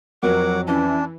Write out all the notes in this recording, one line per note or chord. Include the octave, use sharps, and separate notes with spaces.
F2 F#3 A#4 F#5 D6
E3 C#4 D4